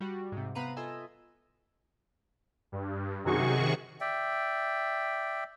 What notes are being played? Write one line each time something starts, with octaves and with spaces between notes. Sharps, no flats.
G3 F#4
G#2 C3
C3 B3 B4 F5 A#5 D#7
F4 A4 D#5 E5 G#5
G2
F#2 C3 D#3 F#4 G#4 C#6
D5 E5 G5